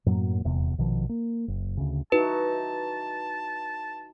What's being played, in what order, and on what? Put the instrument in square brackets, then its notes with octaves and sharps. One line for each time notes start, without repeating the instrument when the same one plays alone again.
[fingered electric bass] F#2 A2 F#3 A#3
D#1 E2 C3
A#1 B2 D#3 F3
A#3
F#1
D2 C#3
[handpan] D#4 E4 F#4 [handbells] B4 [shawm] A5